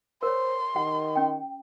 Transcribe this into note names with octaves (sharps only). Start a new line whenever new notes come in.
A#4 C5 C#5 C6
D#3 G4 F#5
C#4 G5